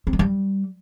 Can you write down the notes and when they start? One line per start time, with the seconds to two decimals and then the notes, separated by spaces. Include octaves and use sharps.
0.07 C4
0.13 G#3
0.19 G3